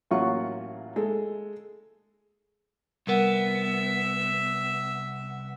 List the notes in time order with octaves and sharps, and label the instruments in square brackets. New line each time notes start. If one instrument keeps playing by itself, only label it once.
[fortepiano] A1 F#3 A#3 F4 F#5 C#6
G#3 A4
[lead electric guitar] C2 B3 [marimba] G3 A#4 F#5 [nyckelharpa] E5